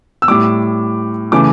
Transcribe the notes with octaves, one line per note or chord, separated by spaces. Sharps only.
E6
A2 G3 D6
C#3 E3 A3 D6